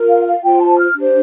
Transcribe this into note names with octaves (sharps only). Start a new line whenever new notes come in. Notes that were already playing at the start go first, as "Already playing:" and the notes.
Already playing: F4 A#4
F5
F5
F4 C5 G5
A5
F6
D4 G4 C5